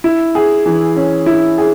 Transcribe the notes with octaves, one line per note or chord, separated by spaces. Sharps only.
E4
G#4
E3
C#4
E4
G#4